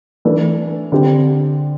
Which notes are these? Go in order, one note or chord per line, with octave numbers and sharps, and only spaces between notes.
E3 A3 D4
D3 C4 G4